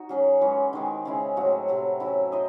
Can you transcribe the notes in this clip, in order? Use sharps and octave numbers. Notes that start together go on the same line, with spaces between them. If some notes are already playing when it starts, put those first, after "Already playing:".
Already playing: D#4 F#4
F#3 C#4 G#4 C#5
E3 G#3 C#4
D#3 G#3 C4
C#3 G#3 C#4 E4
A2 F#3 C4 F#4
C3 F#3 C4
F#3 C#4 E4
C4 E4 C5 D#5